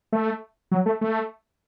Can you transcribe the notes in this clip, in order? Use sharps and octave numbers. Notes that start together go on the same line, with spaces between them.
A3
F#3
A3
A3